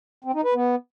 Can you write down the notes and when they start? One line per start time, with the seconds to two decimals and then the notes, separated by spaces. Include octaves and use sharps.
0.24 C4
0.34 D#4
0.44 B4
0.54 B3